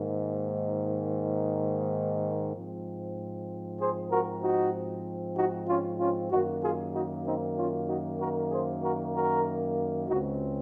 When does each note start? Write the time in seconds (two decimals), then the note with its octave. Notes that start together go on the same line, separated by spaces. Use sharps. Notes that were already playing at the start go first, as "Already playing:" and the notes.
Already playing: G#2 D#3 A#3
2.55 G#2 F3 C4
3.80 G#4 C5
4.11 F#4 A#4
4.42 D#4 F#4
5.37 D#4 F#4
5.68 C#4 F4
6.00 C#4 F4
6.31 F#2 D#3 A#3 D#4 F#4
6.63 F4 G#4
6.95 D#4 F#4
7.26 C4 D#4
7.58 C#4 F4
7.88 D#4 F#4
8.20 F#4 A#4
8.51 G#4 C5
8.83 F#4 A#4
9.15 F#4 A#4
10.09 C#2 C#3 G#3 C4 D#4 F#4